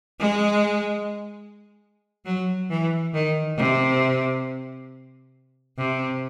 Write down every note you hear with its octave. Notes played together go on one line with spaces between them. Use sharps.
G#3
F#3
E3
D#3
C3
C3